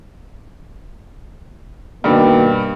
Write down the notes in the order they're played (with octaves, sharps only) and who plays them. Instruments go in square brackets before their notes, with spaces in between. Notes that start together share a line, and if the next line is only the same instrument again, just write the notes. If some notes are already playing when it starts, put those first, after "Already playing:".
[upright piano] G2 G3 [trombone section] B2 D#3 A#3